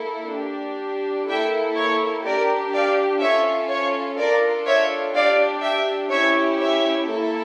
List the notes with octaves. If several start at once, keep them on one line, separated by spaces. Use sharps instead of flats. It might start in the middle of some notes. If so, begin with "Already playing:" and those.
Already playing: A#3 E4 A4
D4 G4
A#3 E4 A4 E5 G5
C#5
D4 G4 A#4 D5
D5 F5
C#4 F4 A4 C#5 E5
C#5
D4 F4 A4 A#4 D5
C#5 E5
D4 G4 D5 F5
E5 G5
C#4 E4 G4 C#5 E5
C#5 E5
A#3 E4 A4